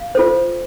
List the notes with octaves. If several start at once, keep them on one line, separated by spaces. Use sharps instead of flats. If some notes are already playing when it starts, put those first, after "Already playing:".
Already playing: F5
F4 A4 C5